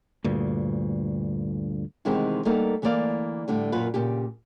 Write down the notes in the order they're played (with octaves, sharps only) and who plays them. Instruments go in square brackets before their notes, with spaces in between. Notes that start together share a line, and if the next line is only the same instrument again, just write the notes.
[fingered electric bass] D2 G2 A#2
[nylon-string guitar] C3 D#3 E3 G#3 B3 C4
G3 A#3 B3 D#4 A4 A#4
D2 E3 A#3 A#4 D5 F5
A2 D3 G3
F#2 A#2 F4 B4
A#2 C#3 G4